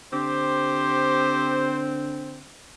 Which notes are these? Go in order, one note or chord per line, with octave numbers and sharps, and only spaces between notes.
D3 C4 G4 C5